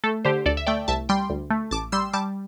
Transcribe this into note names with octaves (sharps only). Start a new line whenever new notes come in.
A3 A4
D3 G4 C5
D2 A4 D5
E5
A3 D5 G5
C2 E5 A5
G3 G5 C6
D2
A3
A1 A5 D6
G3 C6 E6
G3 A5 D6